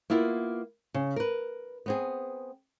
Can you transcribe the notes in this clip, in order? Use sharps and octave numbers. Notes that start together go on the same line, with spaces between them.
A#3 B3 E4 F4
C#3
A#4 B4
B3 C4 G#4